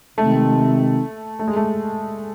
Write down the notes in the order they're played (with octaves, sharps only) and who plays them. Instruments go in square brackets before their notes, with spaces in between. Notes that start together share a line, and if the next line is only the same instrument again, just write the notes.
[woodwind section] C3 D#3 G#3 C4 D#4 [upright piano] A3
[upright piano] A3
G#3
A3